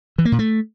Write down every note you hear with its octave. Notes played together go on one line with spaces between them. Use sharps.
E3
A#3
A#2
A3